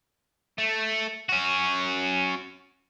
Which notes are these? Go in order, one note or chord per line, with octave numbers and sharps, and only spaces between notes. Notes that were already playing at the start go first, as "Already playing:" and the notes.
A3
C#4 F#4